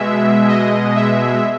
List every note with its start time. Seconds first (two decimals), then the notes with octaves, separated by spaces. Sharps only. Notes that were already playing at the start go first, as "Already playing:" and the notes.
Already playing: B2 G#3 E5
0.49 D#5
0.96 E5